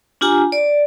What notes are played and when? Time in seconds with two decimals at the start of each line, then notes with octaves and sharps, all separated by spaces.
0.21 D4 F4 G4 G#5 A#5
0.52 D5